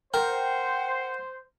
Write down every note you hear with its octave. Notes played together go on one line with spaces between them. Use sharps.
A#4 C5 F#5 G5